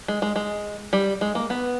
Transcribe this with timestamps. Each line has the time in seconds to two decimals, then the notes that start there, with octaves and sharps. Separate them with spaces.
0.08 G#3
0.22 G#3
0.36 G#3
0.93 G3
1.21 G#3
1.35 A#3
1.50 B3